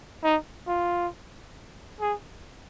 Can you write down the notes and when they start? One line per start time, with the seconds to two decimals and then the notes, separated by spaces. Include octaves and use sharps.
0.23 D#4
0.68 F4
2.00 G#4